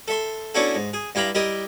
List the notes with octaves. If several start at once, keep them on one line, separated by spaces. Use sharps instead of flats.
A4 E5 C6
B3 C#4 D4 E4 F#4 A4
G#2
G#4
G2 E4 G4 F5 A#5 B5
G3 E4 G4 A#4 D#5